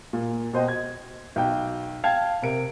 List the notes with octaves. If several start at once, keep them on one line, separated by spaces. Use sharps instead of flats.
A#2
B2 C5 D#5 G5
G#6
B1 G5
F5 G5 A5 G#6
C3 A#4 D7